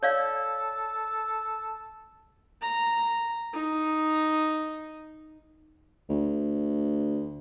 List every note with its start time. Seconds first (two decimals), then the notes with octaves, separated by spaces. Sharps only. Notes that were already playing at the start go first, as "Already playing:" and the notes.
0.03 A4 C#5 D5 F5
2.62 A#5
3.54 D#4
6.09 D2